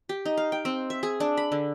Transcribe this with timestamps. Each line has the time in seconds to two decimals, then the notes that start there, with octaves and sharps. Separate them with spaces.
0.09 G4
0.25 D#4
0.37 F5
0.52 G5
0.65 C4
0.90 E5
1.03 G#4
1.20 D4
1.37 B5
1.52 D3